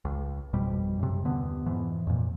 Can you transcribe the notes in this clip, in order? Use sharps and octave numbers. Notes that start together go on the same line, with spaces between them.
C#2
G#1 F2 B2 G3
F#2 C3
D#2 D3 B3
F2 G#2 E3
F2 A#2